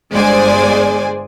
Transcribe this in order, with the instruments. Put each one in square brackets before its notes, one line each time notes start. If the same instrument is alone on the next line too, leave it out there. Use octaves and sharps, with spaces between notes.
[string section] G1 G2 G#3 C5 D5 G#5